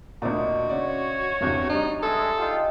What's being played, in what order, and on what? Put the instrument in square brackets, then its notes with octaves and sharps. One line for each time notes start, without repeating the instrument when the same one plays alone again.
[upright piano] D2 A#2 [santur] D4 D#4 C5 [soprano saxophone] F#4
[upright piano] C#3 D5 [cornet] C#5 [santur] E5 F#5
[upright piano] G1 E2 C3
[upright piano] G3 D4 [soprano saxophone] D#4
[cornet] G#3 [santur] G#4 C5 E5 [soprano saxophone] A4
[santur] D#4 G4 [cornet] F4